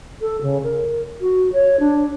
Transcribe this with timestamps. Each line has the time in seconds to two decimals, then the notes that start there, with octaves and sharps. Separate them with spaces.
0.21 A4
0.41 C#3
0.63 A#4
1.21 F#4
1.53 C#5
1.80 D4